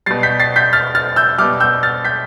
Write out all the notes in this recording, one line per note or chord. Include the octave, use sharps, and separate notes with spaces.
B2 G3 A6 C7
G6 B6
A6 C7
G6 B6
F6 A6
F6 A6
E6 G6
B2 G3 D6 F6
E6 G6
F6 A6
G6 B6